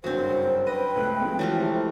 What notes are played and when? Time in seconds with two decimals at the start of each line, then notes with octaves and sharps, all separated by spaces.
0.04 F#1 G2 F#3 C4 C5
0.67 B4 D#5 G5
0.96 C#2 A3 F#6
1.20 F3 G#3 C4
1.39 E3 F#3 A3 A#4
1.58 C3